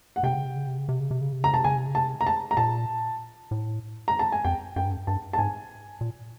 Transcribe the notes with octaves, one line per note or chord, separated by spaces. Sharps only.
F#5
C3 G5
C#3
C3
C#3
C3
C#3
C3
C#3
C3
C#3
C3
C#3 A#5
C3 A5
C#3 G#5
C3
C#3
C3 A5
A#5
A5
A#5
A#2 A5
A2
A#5
A5
G#5
F2 G5
F#2 G5
G2
F#2
G2 A5
A5
G#2 G#5
A#2